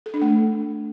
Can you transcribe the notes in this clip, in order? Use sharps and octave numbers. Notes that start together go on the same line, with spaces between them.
A4
D4
A3